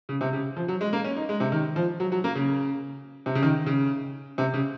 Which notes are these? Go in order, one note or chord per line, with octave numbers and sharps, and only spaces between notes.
C#3
C3
C#3
F3
F#3
G#3
A#3
C#4
D#4
G#3
C3
D#3
F3
F#3
F#3
A#3
C#3
C3
C#3
D#3
C#3
C3
C#3